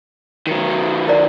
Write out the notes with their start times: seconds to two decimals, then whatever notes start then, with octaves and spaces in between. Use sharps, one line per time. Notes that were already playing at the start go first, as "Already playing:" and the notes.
0.47 D#3 F#3
1.07 E4 A#4 D5